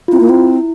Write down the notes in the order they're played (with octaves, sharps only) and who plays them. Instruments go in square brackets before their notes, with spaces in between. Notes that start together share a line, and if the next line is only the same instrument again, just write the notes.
[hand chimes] F4
[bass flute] C4 [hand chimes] E4
[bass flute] A#3
C4